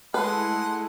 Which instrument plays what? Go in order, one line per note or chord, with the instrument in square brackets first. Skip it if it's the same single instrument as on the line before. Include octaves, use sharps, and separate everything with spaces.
[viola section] G#3 A3 E4 [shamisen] B4 [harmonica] F#5 C6 [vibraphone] A5